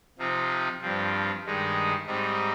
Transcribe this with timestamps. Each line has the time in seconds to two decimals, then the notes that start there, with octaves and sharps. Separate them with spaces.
0.18 C3 F3 C4 D#4
0.81 G2 F3 C4
1.44 G2 D#3 G#3 D#4
2.07 G#2 G3 C4 D#4